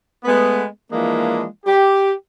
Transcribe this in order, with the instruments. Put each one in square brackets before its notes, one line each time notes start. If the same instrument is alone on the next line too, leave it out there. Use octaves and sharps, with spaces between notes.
[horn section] G#3 A3 B3
E3 F3 G#3 A#3 D4
G4